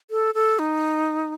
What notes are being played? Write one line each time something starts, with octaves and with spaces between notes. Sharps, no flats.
A4
A4
D#4